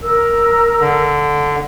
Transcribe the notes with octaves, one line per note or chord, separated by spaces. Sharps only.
A#4 E6
D3